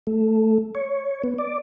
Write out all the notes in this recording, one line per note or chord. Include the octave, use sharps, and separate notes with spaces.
A3
C#5
B3
D5